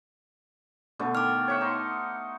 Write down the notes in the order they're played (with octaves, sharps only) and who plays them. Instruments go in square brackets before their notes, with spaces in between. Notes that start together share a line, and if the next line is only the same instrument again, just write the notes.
[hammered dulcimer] B2 D3 A3
[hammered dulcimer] D#3 [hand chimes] D6 F6
[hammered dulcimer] C#5 E5 F#5
D#4 C6